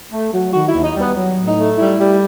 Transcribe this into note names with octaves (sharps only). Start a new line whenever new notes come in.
A3
F#3
D#3 F#4
D#2 E4
D#4
G3
B3
F#3
A2
D#4
A3
G3 E4
G3